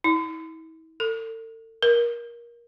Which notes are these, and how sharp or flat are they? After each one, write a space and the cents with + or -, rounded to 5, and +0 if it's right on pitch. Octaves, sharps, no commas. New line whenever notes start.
E4 -40
A4 +40
A#4 +20